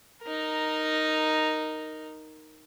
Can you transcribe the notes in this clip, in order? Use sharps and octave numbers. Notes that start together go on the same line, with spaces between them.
D#4 A#4